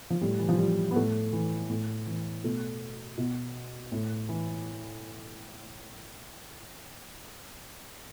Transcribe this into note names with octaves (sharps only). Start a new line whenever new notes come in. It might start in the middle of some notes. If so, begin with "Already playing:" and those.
F3
A2 G3
E3
F3
E3 G3
B3
A2 A3
E3
A2
E3
B2 A3
B2
A2
E3